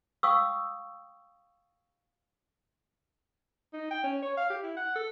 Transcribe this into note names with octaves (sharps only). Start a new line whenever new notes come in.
F5 G5 C#6 D#6 E6
D#4
G5
C#4
C#5
F5
G4
E4
F#5
A4